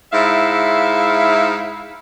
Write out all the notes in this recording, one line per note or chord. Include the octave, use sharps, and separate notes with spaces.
G#2 E4 E5 F5